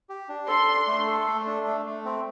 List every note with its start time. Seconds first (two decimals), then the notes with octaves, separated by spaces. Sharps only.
0.09 G4
0.29 D4
0.48 A4 C6
0.68 D4
0.87 A3
1.08 A4
1.27 A3
1.47 D4
1.67 A3
1.86 A3
2.05 C4